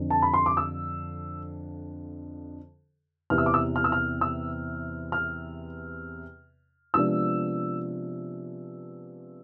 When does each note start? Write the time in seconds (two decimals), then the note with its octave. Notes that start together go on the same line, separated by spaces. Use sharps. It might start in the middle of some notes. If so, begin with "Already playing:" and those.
Already playing: F2 D3 F3
0.10 A5
0.22 B5
0.34 C6
0.46 D6
0.57 E6
3.30 E2 C3 E3 B3 F6
3.38 E6
3.46 D6
3.54 E6
3.76 F6
3.84 E6
3.92 F6
4.21 E6
5.12 F6
6.94 C3 F3 G#3 B3 D4 E6